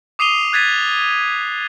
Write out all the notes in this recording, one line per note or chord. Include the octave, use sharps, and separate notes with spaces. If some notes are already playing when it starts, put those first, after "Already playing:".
D6 D#6 C7 D#7 F7 G7
F#6 G#6 A6 B6 D#7